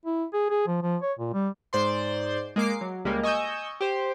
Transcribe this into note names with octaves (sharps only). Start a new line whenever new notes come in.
E4
G#4
G#4
F3
F3
C#5
A#2
G3
G#2 C5 D5 C6
G#3 A#3 D6 C7
F#3
C#2 G3 G#3 A#3
D#5 G#5 C#6 D#6 E6 G6
G4 C5